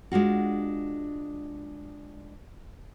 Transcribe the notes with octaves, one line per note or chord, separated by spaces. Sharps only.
G#3 D4 F4 F#4